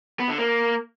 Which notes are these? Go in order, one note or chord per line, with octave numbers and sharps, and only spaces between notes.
B3
D3
A#3